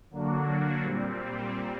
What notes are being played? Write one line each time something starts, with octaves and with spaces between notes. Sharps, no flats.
D3 F#3 A#3 D4 F#4
A#2 G3 C4